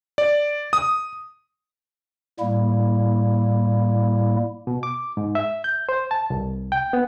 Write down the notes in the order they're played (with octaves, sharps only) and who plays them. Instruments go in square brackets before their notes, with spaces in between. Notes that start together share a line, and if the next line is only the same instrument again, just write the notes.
[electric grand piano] D5
D#6
[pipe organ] A2 G3 A#3 E4
[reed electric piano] B2
D6
G#2
E5
G6
C5
A5
C2
G5
B3